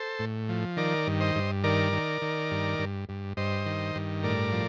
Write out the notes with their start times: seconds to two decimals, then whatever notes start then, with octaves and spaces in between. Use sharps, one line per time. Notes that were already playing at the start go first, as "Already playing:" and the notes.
Already playing: A4 C5
0.19 A2
0.49 F3
0.77 D#3 A#4 D5
1.07 G2
1.20 C5 D#5
1.35 G2
1.64 D#3 A#4 D5
1.93 D#3
2.22 D#3
2.51 G2
2.79 G2
3.09 G2
3.37 G2 C5 D#5
3.66 D#3
3.95 G2
4.23 A2 A#4 D5
4.52 F3